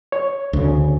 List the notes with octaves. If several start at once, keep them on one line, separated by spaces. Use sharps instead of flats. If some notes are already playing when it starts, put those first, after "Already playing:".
C#5
D2 C#3